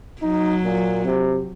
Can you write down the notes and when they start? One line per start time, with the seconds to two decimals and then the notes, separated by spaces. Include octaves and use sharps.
0.22 F#3 D#4
0.64 A#2
1.05 C3